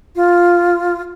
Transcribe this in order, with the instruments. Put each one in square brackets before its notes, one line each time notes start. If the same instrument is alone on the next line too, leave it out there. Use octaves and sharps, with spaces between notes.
[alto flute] F4